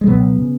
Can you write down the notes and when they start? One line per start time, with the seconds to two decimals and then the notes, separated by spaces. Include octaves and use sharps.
0.01 G#3
0.06 C#2 B2 F#3 B3
0.39 C#3